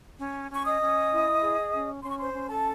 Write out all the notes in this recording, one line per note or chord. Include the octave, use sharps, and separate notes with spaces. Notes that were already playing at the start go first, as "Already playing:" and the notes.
C#4
C#4 C#6
D#5 D#6
C#4
E4
G#4
C#4
C#4 C6
C#6
C5 C6
C#4
A4 A5